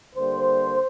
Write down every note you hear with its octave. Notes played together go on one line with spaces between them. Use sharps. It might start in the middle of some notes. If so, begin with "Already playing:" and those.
D3 G3 A#3 C5